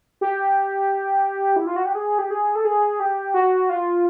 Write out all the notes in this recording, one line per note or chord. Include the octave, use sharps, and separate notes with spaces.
G4
E4
F4
F#4
G4
G#4
G4
G#4
A4
G#4
G4
F#4
F4